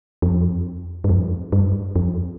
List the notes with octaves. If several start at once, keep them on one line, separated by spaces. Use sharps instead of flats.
F2
G2
F2
G2
F2